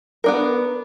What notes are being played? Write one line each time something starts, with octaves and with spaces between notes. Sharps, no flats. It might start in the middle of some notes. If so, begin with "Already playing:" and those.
B3 D4 A#4